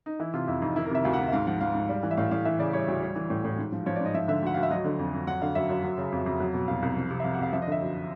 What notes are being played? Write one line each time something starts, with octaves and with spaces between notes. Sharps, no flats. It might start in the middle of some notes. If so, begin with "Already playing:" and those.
D#4
E3 E4
C3 F4
F2 E4
F2 D#4
D#3 E4
A#4
C3 E5
D2 F5
F#5
D2
E5
G#2 F5
F3 F#5
F3 F5
G#2
G3
E3
E5
A2 F5
A2 F5
E3 E5
C#3 D5
G3 C#5
D2
G3
E3
A2
A2
G#2
F3
F3 C#5
D5
G#2 D#5
F3 E5
D3 E5
D2 F#5
D2 F5
E5
F#3 D#5
D3
F2
F2
F#3 F#5
D3 F5
F#2 E5
F#2
F#3
C#3
F2
F2
F#3
B2
C2 F5
C2
F3
C3
E5
F2 F5
F#5
F2 F5
F3 E5
D#5
D3
E5
F#2